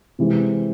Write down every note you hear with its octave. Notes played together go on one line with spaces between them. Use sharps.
C3 E3 G#3 C4